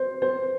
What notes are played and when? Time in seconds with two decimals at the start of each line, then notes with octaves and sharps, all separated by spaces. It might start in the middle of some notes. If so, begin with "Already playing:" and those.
Already playing: C5
0.22 C5